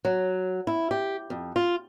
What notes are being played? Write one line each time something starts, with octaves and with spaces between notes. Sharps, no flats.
F#3
E4
G4
F2
F4